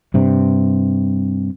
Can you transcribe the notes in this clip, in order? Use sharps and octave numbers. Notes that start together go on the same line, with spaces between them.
G2 C3